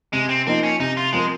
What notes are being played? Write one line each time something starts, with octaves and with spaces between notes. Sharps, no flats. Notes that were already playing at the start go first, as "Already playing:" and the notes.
C3 G#3
C4
F3 A#3 C4 D#4
C#4
C3 D#4
F4
F3 G#3 C4 F4 A#4